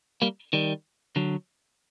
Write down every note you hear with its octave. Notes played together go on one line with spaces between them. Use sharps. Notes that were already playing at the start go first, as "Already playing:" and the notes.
G3 A#3
D#3 G3
D3 F#3